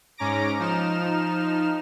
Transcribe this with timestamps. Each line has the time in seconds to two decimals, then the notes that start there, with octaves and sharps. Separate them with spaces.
0.17 G#2 C#4 A#5 D6 A#6 D7
0.59 F3 D#4 F6 E7